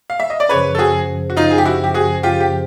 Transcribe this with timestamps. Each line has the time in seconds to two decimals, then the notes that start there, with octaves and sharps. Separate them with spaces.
0.10 F5
0.20 E5
0.30 D#5
0.40 D5
0.49 F#2 C#3 F3 B4 C#5
0.75 A4
0.78 F#4 G#4
1.30 F#4
1.37 D#4 F4
1.51 G#4
1.58 G4
1.65 E4 F#4
1.84 G4
1.94 F#4 G#4
2.23 F4 G4
2.40 G4